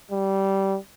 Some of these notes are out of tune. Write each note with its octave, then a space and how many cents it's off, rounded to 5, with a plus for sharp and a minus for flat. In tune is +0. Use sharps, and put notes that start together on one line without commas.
G3 -15